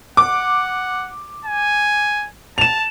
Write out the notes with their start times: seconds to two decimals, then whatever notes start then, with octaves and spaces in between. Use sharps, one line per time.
0.17 F#5 D6
1.45 G#5
2.58 A5 E7 F7